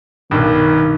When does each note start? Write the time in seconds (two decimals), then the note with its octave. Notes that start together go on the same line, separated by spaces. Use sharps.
0.31 B1 G2 D#3